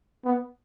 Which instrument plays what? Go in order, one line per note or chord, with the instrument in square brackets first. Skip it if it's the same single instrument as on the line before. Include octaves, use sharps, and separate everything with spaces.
[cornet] B3